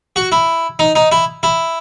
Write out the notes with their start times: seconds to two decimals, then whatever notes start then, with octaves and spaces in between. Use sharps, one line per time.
0.16 F#4
0.32 E4
0.79 D#4
0.95 D#4
1.12 E4
1.43 E4